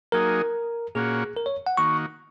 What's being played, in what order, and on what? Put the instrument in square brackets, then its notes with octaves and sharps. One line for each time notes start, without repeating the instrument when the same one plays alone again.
[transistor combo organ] F#3 A#3 D#4 G#4 [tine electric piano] A#4
[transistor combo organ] A#2 A#3 C#4 F#4 [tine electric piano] G#4
[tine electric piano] A#4
C#5
F#5
[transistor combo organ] D#3 A#3 F#4 [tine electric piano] C#6